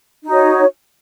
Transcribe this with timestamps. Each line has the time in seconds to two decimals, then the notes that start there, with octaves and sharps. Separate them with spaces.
0.23 D#4
0.28 F#4
0.32 C#5